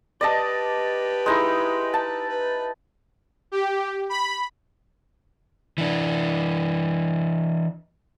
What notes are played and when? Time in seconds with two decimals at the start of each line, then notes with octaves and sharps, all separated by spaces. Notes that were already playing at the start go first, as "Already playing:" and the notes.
0.21 G4 B4 D5 D#5 A5
1.26 G#3 D#4 E4
1.94 A5
2.29 B4
3.52 G4
4.09 B5
5.78 E3 D4